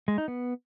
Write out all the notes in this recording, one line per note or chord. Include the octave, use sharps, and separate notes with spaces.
G#3
D#4
B3